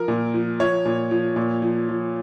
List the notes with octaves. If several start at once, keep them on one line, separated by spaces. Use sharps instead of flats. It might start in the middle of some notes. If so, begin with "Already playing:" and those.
Already playing: F3 A#4
A#2
F3
F3 C#5
A#2
F3
A#2
F3
F3